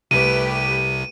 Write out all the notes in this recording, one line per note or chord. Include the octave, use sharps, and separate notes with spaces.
C2 C3 A3 G4 B4 D#7